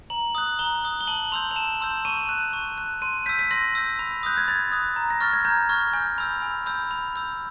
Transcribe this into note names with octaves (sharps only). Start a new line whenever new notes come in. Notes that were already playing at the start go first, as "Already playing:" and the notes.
A#5 F#7
D#6 F#6
A#5 G7
D#6 F#6
G7
A5 F#7
C6 E6 G6 F7
F7
A5 E7
C6 E6 G6
C#6 D#7
F#6
C#6
F#6
C6 D#7
E6 G6 B6
B6
C6 A#6
E6 G6
B5
D#6 F#6 G6
G#6
B5 A6
D#6 F#6
A#5
A#6
C#6 F6 A6
G#6
A#5 G6
C#6 F6 G#6
G#5 G6
B5 E6 G6
G#5
B5 E6 G6
B5
E6 G6